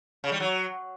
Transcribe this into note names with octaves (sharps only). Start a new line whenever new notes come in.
C#3
G3
F#3